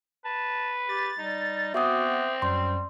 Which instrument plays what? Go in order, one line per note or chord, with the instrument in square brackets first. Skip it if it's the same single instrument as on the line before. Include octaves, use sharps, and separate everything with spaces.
[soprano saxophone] B4 [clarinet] A5
[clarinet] G4 [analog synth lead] A6
[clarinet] G3 [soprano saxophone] D#4
[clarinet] B3 [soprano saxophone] C4 [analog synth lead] F#4 [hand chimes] E5 D6 D#6
[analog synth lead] F#2 [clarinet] G3 [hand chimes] C6